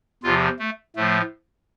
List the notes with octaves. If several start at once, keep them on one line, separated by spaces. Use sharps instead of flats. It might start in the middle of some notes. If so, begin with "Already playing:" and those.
E2 C3 F3 F4
A3
A2 F3 A3